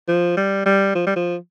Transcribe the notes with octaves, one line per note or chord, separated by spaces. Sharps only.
F3
G3
G3
F3
G3
F3